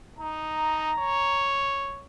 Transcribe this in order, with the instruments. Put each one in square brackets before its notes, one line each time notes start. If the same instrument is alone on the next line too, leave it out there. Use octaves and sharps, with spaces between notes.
[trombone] D#4 [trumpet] A#5
[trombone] C#5